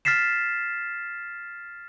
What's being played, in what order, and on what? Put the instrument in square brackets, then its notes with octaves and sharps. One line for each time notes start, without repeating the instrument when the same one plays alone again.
[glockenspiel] F6 A6 B6 C7 E7